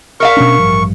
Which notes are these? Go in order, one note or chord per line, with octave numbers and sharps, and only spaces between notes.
A#4 E5 F5 C#6
B2 C#4 D4
A1 G2 F3